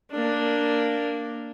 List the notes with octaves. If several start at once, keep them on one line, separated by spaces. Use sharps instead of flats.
A#3 D4